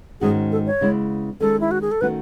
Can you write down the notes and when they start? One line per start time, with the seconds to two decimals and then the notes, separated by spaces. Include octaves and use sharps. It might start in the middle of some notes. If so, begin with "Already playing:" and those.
0.21 G#2 D#3 G#3 C#4 F#4 G#4
0.52 A4
0.67 C#5
0.81 C#3 G#3 B3 E4
1.41 D#3 G#3 C#4 A4
1.60 E4
1.71 F#4
1.81 G#4
1.91 A4
2.01 D#3 A3 C#4 F#4 B4